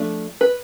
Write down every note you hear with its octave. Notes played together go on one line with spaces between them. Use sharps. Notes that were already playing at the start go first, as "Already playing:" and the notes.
Already playing: F3 A3 D4
B4